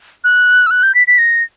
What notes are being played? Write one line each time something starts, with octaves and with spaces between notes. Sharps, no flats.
F#6
E6
F#6
G6
B6
B6
A#6